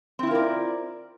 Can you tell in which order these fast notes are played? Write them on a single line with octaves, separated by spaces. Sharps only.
C4 E4 F4 A#4 D5